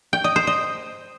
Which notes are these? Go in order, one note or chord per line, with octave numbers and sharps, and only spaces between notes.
G5
D#5
C5
D#5